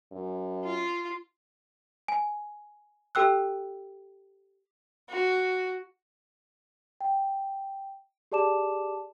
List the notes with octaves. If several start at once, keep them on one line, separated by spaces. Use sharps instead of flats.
F#2
F4
G#5
G4 A4 G5 E6 F#6
F#4
G5
G4 G#4 D5 A5 D6 E7